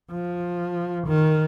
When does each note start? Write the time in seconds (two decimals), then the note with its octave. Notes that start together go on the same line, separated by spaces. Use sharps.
0.12 F3
1.07 D#3